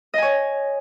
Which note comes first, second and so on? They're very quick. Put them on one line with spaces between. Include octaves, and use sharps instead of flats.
D#5 G#5 C#5